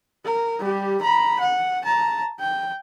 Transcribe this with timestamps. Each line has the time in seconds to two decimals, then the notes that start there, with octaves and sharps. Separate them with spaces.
0.25 A#4
0.60 G3 G4
1.02 A#5 B5
1.40 F#5
1.85 A5 A#5
2.40 G5